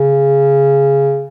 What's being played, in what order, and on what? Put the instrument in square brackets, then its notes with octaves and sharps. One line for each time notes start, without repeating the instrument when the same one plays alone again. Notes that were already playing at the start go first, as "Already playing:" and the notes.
Already playing: [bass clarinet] C#3